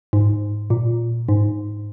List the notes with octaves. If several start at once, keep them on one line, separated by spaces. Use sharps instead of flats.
G#2
A#2
G#2